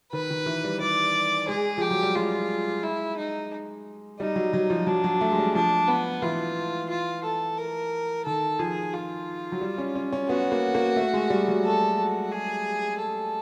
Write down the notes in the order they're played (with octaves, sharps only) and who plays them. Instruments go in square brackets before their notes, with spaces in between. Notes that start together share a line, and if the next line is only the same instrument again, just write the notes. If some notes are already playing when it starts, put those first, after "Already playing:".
[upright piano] D#3 [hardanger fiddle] B4
[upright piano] D#3
E3
G3
[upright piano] G3 [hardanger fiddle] D5
[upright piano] G#3 [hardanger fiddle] G#4
[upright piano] F3 [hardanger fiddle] G4
[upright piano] F#3
G3
[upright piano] G#3 [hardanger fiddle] F4
[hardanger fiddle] E4
D#4
[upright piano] G3 [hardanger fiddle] D#4
[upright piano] F#3
F#3
F3
[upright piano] F#3 [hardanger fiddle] D4
[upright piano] F#3
A3
G#3
G3
[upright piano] F3 [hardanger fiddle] D4
[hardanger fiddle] B3
[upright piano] E3 [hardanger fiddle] F4
[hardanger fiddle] F4
A4
A#4
[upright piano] D#3 [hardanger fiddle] A4
[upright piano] F3 [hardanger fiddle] G#4
[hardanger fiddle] F4
[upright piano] F#3
G3
C#4
C#4
C#4
[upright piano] B3 [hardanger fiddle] F#4
[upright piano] A#3
A#3
A3
G#3
G3
F#3
[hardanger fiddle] A4
F#4
G#4
A4